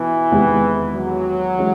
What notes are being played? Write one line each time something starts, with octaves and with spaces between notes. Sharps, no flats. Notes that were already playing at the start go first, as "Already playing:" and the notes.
Already playing: B2 E3
E2 C3 D#3 G#3 B3
F#3
E3 G#3 C#4